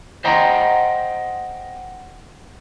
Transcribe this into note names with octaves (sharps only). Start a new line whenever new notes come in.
C5 D#5 F#5 G5 A#5